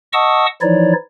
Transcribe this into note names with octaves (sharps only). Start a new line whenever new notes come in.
D#5 F#5 A5 C#6 D#6 E6
E3 F3 D#4 E4 C#5 D5